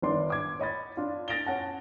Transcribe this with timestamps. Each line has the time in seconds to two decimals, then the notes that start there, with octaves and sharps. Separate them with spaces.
0.02 G1 D#3 D4 D5 C6
0.30 D6 G#6
0.59 C#5 D#5 B5 A6
0.97 D4 F4
1.28 A6 A#6 D7 F7 G7
1.46 C#4 F#5 A5